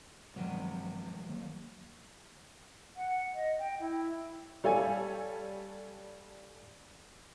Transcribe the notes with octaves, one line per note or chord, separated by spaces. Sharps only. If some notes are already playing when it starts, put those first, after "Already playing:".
G2 C3 D#3 F3 F#3 G#3
D#3 F#3 A#3
F#5
D#5
G5
E4
G3 G4 A4 C#5 F5 G#5